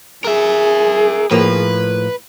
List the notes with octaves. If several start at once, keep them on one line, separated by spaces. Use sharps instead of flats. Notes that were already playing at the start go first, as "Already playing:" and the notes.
G#4 A#4 E5
A2 F3 A#3 B4